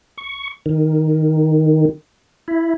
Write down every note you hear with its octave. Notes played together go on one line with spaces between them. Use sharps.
C#6
D#3
E4